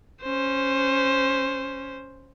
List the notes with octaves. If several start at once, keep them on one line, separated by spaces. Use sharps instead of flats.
C#4 C5